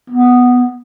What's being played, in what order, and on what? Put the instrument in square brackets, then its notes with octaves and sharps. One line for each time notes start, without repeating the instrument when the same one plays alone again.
[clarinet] B3